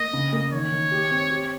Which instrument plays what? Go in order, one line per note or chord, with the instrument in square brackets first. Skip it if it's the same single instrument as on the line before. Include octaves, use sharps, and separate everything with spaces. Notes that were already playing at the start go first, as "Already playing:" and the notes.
Already playing: [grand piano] A#3 [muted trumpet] D#5
[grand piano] C#3
A#3
[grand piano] D#3 [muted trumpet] C#5
[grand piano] D#3
G4
C4
G4